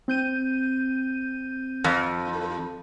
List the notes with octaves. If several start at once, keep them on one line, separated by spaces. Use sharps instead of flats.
C4 G6 D#7
F2